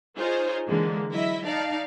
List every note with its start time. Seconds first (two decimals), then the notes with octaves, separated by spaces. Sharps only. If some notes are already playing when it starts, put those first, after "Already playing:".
0.16 D#4 F4 G#4 C5 C#5
0.68 D3 E3 G#3 A#3
1.12 F#3 E4 D#5 E5
1.45 D#4 D5 F5 A5